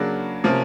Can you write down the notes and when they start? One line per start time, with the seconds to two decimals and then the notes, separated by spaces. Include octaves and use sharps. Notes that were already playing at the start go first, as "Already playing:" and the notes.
Already playing: C#3 F#3 A#3 D4
0.44 C3 F3 A#3 C#4